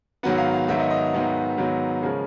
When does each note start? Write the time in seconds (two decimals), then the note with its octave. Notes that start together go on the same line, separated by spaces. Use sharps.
0.23 G#2 D#3 F#3 B3 F#5
0.38 F5
0.53 F5
0.68 G#2 D#3 F#3 B3 E5
0.79 D#5
0.90 D#5
1.14 G#2 D#3 F#3 B3
1.58 G#2 D#3 F#3 B3
2.02 C#3 F3 G#3 C#4 A#4